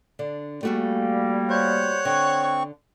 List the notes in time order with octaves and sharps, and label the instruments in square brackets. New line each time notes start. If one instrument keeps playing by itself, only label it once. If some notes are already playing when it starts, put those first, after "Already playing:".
[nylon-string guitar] D3 D4
[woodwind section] G3 A#3 [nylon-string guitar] A3 F#4 G#4
[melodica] C5 [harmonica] C#5 F#5
[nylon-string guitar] D3 D#5 [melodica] C4 C#6